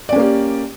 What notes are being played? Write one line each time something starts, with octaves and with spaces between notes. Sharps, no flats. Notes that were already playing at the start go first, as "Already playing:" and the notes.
A#3 C#4 G4 D5